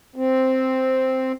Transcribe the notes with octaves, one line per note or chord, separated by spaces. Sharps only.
C4